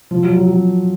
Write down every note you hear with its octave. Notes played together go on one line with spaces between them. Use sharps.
F3
F#3
F#3
F#3